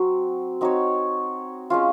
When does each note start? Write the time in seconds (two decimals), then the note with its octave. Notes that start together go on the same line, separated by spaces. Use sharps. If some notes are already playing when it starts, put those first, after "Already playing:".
Already playing: F#3 C4 F#4
0.61 C4 D#4 F#4 C#5
1.70 G#3 C#4 F4